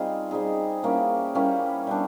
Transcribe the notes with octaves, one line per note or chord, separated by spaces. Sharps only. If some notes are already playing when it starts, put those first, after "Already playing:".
Already playing: G3 C4 D#4 F4 G#4
G3 C4 D#4 G#4
G3 A#3 C#4 E4
G3 A#3 C#4 E4
G3 B3 D4